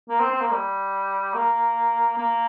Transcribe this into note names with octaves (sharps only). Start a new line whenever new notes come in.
A#3
C4
C4
A#3
G3
A#3
A#3